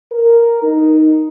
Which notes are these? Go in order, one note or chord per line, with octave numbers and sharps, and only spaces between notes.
A#4
D#4